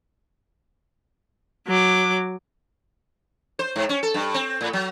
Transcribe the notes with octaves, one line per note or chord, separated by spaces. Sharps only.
F#3 D6
C5
G#2
C#4
A4
G2
C4
A2
F#3